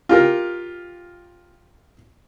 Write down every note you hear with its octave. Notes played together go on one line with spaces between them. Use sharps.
F4 G4 A#4